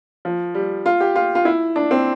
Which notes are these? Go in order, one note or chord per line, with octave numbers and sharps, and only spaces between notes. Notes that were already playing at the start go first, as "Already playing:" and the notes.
F3
G3
F4
G4
F4
F4
E4
D4
C4